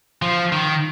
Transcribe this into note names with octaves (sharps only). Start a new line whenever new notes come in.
F3
D#3